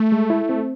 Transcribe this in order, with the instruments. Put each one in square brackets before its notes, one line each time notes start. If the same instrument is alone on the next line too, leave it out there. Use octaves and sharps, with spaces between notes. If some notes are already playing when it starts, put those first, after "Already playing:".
Already playing: [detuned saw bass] A3
[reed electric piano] G#3
E4
C4